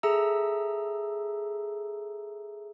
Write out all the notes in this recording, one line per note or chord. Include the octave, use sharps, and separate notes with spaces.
G#4 A4 E5 A#5 E6